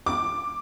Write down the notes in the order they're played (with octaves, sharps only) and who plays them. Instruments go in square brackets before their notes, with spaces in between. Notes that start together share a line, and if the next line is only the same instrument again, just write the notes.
[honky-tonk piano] D6